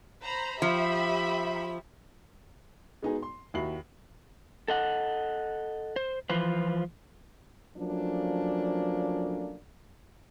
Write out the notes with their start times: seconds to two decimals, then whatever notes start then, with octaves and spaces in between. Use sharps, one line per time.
0.24 C5 A#5 B5
0.62 F3 G4 E5 B5
3.03 G#3 B3 D#4 F#4 G#4
3.23 C6
3.54 D#2 E4 F#4 B5 C7 F#7
4.68 A4 D#5 F#5
5.96 C5
6.30 E3 F3 F4 B4 C5
7.77 F3 F#3 A3 A#3 C#4 D4